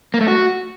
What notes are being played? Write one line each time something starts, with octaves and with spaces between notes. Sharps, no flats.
A#3
A3
F#4